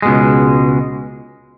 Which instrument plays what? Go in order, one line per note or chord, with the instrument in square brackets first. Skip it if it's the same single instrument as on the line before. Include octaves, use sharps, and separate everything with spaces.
[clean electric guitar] C#2 B2 G#3